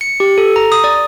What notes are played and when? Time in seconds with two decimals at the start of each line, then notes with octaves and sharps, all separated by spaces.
0.01 C#7
0.20 G4
0.38 A4
0.56 A#5
0.72 D#6
0.84 D5